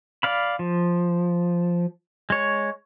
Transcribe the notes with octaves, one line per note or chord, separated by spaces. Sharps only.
D5 F5 B5
F3
G#3 C#5